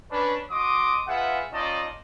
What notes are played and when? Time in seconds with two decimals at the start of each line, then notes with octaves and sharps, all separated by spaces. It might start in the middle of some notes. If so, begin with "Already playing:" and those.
0.12 C#4 D4 B4
0.51 F#4 D#5 C6 D6 D#6
1.08 F4 G#4 B4 E5 F#5
1.53 C#4 D#4 F4 D5 D#5 A5